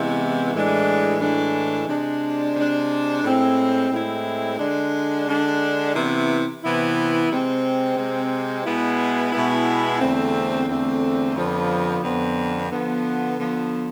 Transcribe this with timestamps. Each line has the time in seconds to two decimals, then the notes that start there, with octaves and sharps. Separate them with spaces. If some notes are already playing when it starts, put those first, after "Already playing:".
Already playing: C3 E3 G#3 B3 E4
0.53 A2 E3 G#3 D4
1.20 A2 E3 G#3 D4
1.88 C3 G#3 D4
2.56 C3 G#3 D4
3.24 A2 G#3 C4 E4
3.91 A2 G#3 C4 E4
4.59 D3 G#3 D4
5.26 D3 G#3 D4
5.94 C3 E3 B3 E4
6.62 C3 E3 B3 E4
7.30 C3 G#3 C4
7.97 C3 G#3 C4
8.65 B2 G#3 B3 E4
9.32 B2 G#3 B3 E4
10.00 E2 D3 A3 C4
10.68 E2 D3 A3 C4
11.35 F2 D3 F3 B3
12.03 F2 D3 F3 B3
12.70 D3 F3 B3
13.38 D3 F3 B3